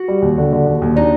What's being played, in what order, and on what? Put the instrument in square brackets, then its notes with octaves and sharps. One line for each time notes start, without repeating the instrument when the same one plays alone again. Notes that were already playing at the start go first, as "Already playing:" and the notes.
Already playing: [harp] F#4
[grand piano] G3
D#2
D3
D3
D#2
D#2
[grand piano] D4 [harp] D#4